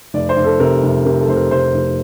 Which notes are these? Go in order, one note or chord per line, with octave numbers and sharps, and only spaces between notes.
F1 D5
C5
F1
A4
C3 A#4
F1
C3 A#4
A4
F1 C5
A#4
F1 C5
F1